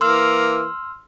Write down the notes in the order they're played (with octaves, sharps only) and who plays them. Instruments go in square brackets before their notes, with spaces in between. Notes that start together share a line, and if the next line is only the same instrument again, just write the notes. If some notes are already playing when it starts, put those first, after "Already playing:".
[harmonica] E3 A#3 [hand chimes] C6 E6 F6